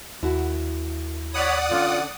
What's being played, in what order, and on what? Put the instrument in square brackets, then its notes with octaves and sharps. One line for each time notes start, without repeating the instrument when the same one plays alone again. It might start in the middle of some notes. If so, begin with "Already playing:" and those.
[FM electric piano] D#2 [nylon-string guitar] E4 F#4
[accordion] C#5 B5 [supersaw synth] D5 F#5 D#6
[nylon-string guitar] D3 C#4 [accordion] F4